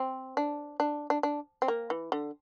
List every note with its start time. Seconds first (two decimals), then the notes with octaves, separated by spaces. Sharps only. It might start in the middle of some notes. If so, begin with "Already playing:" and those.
Already playing: C4
0.37 D4
0.80 D4
1.10 D4
1.23 D4
1.62 C4
1.68 A#3
1.90 E3
2.12 D3